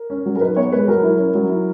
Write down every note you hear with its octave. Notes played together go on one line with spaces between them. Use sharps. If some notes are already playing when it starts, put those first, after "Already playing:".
Already playing: A#4
C#4
F#3
A#4
D#4 B4
B3 C#5
G#3 B4
F#3 A#4
E4
C#4
F#3
E4